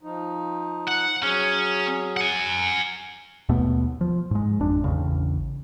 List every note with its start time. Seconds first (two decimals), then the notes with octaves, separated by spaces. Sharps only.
0.03 F3 D#4
0.87 F#5
1.22 F#3 C#4 G#4
2.17 F#5 G#5
3.49 D#2 B2 A3 B3
4.01 F3
4.31 G#2 G#3
4.60 G#1 F2 D4
4.84 A1 E2 C#3